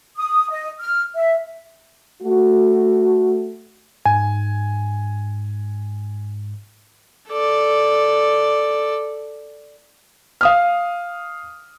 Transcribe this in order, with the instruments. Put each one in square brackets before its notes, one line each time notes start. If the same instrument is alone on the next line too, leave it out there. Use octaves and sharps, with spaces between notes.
[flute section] D#6
D#5
F6
E5
[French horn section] A3 F#4
[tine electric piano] G#2 [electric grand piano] G#5
[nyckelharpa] A4 D5
[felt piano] F5 D#6 F6